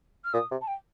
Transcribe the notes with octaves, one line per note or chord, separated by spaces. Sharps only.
F6
A#2 D#6
C3
A5
G5